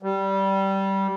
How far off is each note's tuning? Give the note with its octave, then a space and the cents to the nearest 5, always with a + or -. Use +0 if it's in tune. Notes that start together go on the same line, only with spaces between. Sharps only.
G3 -15